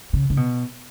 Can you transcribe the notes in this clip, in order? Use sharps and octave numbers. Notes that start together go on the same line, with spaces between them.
C#3
C#3
B2